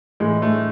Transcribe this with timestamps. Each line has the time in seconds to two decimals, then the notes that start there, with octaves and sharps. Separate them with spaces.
0.20 A2 E3 G#3
0.42 A3